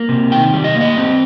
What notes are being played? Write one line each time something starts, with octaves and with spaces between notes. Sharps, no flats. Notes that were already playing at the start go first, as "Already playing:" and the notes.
Already playing: A#3
C3
D#3 G5
G3
D#5
A#3
D#5
C4